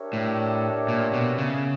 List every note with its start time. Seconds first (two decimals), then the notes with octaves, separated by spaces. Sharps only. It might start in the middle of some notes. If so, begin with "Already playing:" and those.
Already playing: D4 G4 A#4 C#5 E5
0.13 A2
0.88 A#2
1.13 B2
1.38 C#3